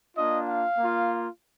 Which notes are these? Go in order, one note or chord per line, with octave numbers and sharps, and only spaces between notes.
A#3 D4 F4 D#5
F5
A#3 F4